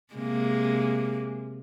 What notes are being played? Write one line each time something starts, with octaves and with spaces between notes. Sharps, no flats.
C3 G#3 A#3